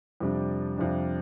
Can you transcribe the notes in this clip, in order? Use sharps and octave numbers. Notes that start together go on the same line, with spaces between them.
F2 C3 G3 D4
F2 C3 G3 D4